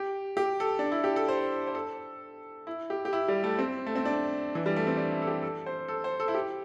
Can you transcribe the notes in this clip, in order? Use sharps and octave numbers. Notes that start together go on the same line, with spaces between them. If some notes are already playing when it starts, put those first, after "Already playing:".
Already playing: G4
G4
A4
D4
E4
G4
A4
C5
C5
A4
E4
G4
G4
E4
G3
A3
C4
A3
C4
D4
E3
G3
A3
C4
D4
E4
A4
G4
A4
C5
A4
C5
A4
E4
G4